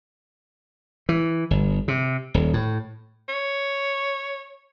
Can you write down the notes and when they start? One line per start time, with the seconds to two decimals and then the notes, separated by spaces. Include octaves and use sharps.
1.09 E3
1.51 G1
1.88 C3
2.34 D#1
2.54 A2
3.29 C#5